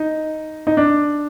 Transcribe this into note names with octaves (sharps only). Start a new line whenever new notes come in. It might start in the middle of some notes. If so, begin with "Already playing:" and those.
Already playing: D#4
D#4
D4